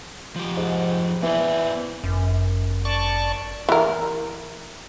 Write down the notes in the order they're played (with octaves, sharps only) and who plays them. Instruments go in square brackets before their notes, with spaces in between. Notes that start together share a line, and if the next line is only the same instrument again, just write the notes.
[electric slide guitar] F3 G4
[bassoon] G#2
[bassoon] E3 [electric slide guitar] B3 C5 D5
[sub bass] G1 [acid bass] F#2
[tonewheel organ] D5 A5 C#6
[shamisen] E3 A#4